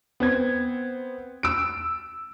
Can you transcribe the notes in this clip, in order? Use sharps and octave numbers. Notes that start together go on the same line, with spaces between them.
B3 C4 G#6
E6 D7